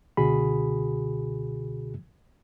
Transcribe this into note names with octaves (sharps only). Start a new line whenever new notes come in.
C#2 B2 D3 F#4 G#4 B5